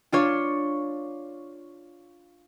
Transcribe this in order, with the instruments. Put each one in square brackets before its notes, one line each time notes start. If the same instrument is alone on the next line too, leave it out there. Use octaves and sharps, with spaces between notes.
[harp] D4 F4 C#5